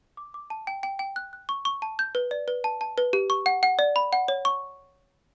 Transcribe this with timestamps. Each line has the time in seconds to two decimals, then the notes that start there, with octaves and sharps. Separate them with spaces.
0.17 D6
0.34 D6
0.50 A5
0.67 G5
0.83 G5
0.99 G5
1.16 F#6
1.33 F#6
1.49 C#6
1.65 C#6
1.82 A5
1.99 G6
2.15 B4
2.31 D5
2.48 B4
2.64 A5
2.81 A5
2.98 B4
3.13 G4
3.30 C#6
3.46 F#5
3.63 F#5
3.79 D5
3.96 B5
4.13 F#5
4.28 C#5
4.45 C#6